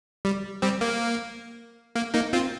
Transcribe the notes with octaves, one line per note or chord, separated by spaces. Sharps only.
G3
G3 C4
A#3
A#3
A#3 D#4
C4 F4